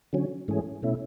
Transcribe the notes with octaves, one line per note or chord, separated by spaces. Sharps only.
D3 F#3 C#4
G#2 E3 A3 C#4 G#4
B2 A3 C#4 E4